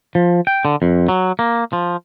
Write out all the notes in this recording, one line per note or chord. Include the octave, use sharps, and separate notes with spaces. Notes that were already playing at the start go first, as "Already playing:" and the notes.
F3
G5
D3
F2
F#3
A#3
F3